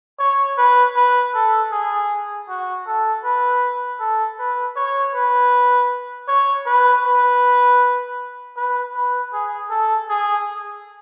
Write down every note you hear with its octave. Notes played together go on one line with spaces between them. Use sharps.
C#5
B4
B4
A4
G#4
F#4
A4
B4
A4
B4
C#5
B4
C#5
B4
B4
B4
B4
G#4
A4
G#4